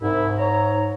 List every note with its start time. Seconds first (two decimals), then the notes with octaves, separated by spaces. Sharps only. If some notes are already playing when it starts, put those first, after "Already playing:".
0.01 C2 G#2 E4
0.38 C#5 A#5